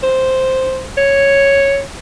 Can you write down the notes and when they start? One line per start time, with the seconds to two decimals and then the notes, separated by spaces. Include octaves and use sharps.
0.03 C5
0.97 C#5